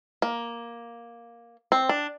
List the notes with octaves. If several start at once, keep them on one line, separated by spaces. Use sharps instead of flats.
A#3
C4
D4